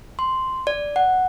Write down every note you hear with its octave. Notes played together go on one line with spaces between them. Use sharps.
C6
D5
F#5